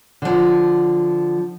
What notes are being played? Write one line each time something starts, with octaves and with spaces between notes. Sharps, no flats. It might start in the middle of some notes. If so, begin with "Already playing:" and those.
D3 F3